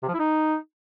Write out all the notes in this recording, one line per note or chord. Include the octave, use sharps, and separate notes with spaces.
C3
F3
E4
D#4